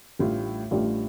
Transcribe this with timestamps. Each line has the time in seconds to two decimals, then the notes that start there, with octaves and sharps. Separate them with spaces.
0.19 A1 A2 G3 D4 F4
0.71 A1 A2 G3 D4 F4